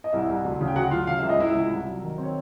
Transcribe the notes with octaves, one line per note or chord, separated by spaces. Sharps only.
D#5
C2 E4 E5
C2
D2
C#3
G5
D2 F#4 F#5
F#3 F4 F5
C#3 F5
C#2 E5
D#5
C#2 E4 E5
C#2
C2
F#3
D#3
C4
C#5